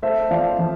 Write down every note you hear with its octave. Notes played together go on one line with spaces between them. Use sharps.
A3 C5 E5
F3 D5 F5
F3